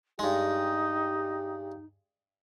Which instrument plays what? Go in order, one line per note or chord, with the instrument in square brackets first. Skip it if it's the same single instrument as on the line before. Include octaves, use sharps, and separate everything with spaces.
[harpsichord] G2 G#3 [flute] D#4 [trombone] G4